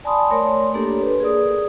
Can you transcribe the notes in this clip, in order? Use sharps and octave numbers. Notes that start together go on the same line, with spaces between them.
D5 G#5 A5 B5 C6 D#6
A3 A#4 C#5 D5 C6
A#3 D4 G4 A4
B4
G#4 A#4 D5 D#6